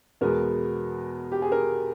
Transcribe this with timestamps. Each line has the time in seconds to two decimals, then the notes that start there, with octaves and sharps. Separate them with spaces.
0.21 E2 B2 G#3 B3 A#4
1.32 G4
1.42 G#4
1.52 A#4